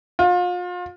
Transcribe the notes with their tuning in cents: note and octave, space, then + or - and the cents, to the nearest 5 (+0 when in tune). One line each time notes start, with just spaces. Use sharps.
F4 +35